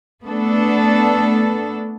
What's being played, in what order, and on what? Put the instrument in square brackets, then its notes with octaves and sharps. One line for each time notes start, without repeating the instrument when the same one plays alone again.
[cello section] A3 B3 D4 A4